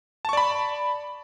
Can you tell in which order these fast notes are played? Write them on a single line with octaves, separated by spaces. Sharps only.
A5 C#6 D5 B5